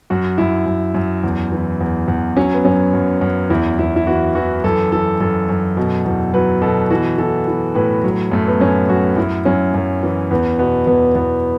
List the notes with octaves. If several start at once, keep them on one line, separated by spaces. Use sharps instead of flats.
F#2 F#4
F#2 E4
F#2
F#2
E2
E3
E2
E2
F#3 C#4
B3
F#2 C#4
F#2
F#2
E2 E4
E2 E4
E4
E3 F#4
E3 F#4
F#2 A4
E3 A4
F#2 A4
F#2
B2
E2
F#3 B4
B2 A4
E3 F#4
E3 A4
E3
A2 B4
F#3
F#2 A3
B3
F#2 C#4
F#2 F#4
F#2 E4
F#2 C#4
F#2
E3
E2 B3
B2 B3
E2 B3
E2 B3